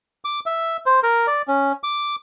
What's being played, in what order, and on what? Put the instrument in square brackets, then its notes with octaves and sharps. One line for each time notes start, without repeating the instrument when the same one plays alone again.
[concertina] D6
E5
C5
A#4
D5
C#4
D6